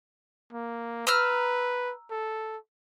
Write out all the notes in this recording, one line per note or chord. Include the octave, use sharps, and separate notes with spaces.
A#3
B4 A#5 E6 F6
A4